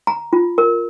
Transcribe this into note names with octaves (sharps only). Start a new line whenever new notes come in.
A#5
F4
A#4